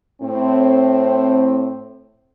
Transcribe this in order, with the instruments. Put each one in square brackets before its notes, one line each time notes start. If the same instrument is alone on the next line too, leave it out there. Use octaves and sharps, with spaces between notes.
[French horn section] A2 C4